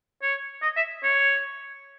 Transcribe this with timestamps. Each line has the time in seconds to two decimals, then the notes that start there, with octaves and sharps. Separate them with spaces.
0.22 C#5
0.63 D#5
0.76 E5
1.03 C#5